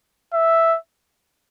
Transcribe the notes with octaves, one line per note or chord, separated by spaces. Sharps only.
E5